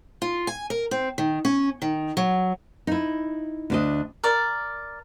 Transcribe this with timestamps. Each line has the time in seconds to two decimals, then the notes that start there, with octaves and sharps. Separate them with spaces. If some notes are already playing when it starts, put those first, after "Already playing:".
0.22 F4
0.47 G#5
0.70 A#4
0.91 C4
1.18 D#3
1.45 C#4
1.82 D#3
2.17 F#3
2.87 D#4 E4
3.70 D2 D4 D#5
4.24 A#4 D5